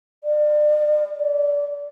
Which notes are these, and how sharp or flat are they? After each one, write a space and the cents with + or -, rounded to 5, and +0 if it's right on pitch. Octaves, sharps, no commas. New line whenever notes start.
D5 +35
D5 -25